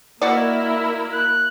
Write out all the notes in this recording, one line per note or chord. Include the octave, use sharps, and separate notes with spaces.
B2 A#3 E4 F#4 A#4 D5
F#6